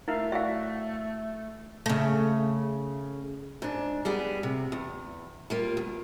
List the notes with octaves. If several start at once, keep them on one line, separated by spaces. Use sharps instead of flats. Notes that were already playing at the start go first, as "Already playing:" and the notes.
A3 E4 A#4 E5 F5
F#4 D5 E5 F5
C#3 A3
G#2 D4
G3 B3 G#4
C3
E2
G3 A#3 F4
E2